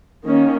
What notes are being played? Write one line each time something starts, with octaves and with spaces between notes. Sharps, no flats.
D#3 A#3 C#4